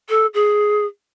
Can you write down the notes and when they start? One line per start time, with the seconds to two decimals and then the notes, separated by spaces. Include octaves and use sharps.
0.09 A4
0.34 G#4